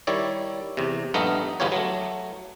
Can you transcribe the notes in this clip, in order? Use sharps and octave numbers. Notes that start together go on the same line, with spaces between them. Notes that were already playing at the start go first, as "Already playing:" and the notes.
D#3 G3 E4 C#5 D5
E2 C3
A#1 G2 A3 B3 D#4 D#5
G1 E2 B3 F4 G4 C#5
F#3 A3